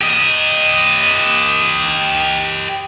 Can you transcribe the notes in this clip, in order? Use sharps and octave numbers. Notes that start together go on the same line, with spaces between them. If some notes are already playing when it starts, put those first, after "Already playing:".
G4 D#5